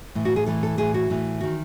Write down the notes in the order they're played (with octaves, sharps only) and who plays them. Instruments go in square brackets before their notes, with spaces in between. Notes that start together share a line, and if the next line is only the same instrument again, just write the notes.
[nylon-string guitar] A2 E3
F#4
G#4
A2 E3 A4
A4
A2 E3 G#4
F#4
A2 E3
D#3 F#4